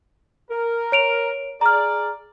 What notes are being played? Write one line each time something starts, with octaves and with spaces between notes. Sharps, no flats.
A#4
C#5 D7 F7
G#4 D5 A#5 F6